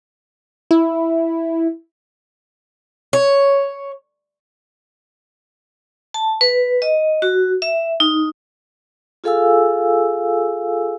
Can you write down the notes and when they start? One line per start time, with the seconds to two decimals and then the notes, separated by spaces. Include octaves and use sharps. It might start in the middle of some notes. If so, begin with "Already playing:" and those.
0.71 E4
3.13 C#5
6.14 A5
6.41 B4
6.82 D#5
7.22 F#4
7.62 E5
8.00 D#4
9.24 F4 G#4 A4 F5 G#5 E6